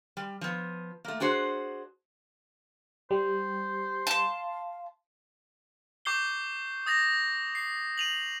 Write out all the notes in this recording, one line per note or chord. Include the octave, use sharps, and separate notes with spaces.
G3
F3 B3
A3 A#3
D4 F#4 G#4 C5
G3 C5
F5 A5 C6
C#6 D6 G6 C7 G7
D#6 A6 A#6 F7
C7
D#7 F7 F#7